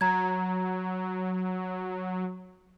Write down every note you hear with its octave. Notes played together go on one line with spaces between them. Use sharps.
F#3 A#5 G#6